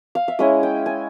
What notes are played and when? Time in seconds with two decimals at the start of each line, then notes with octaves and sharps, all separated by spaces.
0.15 F5
0.28 E5
0.39 G#3 C#4 E4 D#5
0.63 G5
0.86 G#5